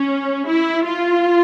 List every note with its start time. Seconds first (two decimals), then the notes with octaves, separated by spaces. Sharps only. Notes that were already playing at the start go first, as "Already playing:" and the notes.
Already playing: C#4
0.48 E4
0.85 F4